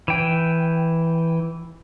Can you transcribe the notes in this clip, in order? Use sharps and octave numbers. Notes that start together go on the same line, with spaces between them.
E3 G5